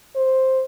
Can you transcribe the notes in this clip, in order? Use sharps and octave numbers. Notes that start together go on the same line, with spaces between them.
C5